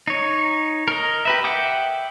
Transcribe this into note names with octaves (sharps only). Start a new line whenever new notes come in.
D#4 C#5
A#4 D#5
G4 B4 E5
E5 F#5 G5 D6 D#6